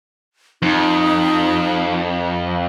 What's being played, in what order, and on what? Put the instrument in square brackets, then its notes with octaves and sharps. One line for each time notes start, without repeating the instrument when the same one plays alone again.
[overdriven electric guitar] F2 [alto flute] D#4